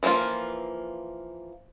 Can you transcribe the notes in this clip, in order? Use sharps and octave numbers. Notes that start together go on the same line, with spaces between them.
E3 F3 G3 A#3 F4